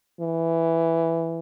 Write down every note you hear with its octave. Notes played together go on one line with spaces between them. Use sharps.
E3